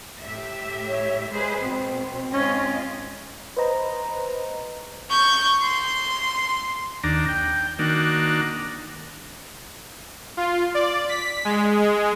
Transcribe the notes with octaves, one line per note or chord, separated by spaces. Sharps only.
A2 G4 E5
C#5
G#3 G#4 B4 C5
B2 C4
G#2 C#4 F4 D#5
B4 C5 D#5 A#5
C#6 G6
C6
D#2 D4 A#5
G5
D#3 A#3 D4 F#4
F4
D5
B6
G#3
G#3